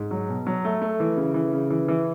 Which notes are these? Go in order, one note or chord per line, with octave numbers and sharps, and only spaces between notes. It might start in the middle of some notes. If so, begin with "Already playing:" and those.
Already playing: G#2
F#3
B2
F#3
A3
A3
E3
C#3
E3
C#3
E3
E3